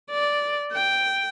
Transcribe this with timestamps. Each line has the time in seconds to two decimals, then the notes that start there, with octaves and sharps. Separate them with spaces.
0.11 D5
0.73 G5